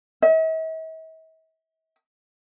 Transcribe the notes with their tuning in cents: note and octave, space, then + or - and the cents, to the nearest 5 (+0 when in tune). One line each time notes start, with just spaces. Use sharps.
E5 -45